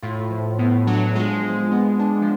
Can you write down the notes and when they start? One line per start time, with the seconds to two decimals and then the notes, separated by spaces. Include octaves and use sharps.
0.03 A2 F4
0.31 F3
0.59 A2 B3
0.87 F#3 D4
1.15 G#3 F4
1.43 F3
1.71 B3
1.99 D4
2.21 F3